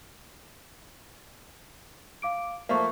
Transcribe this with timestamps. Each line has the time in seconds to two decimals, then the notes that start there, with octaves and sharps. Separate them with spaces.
2.22 F5 D6 D7
2.69 F3 A3 A#3 E5 C#6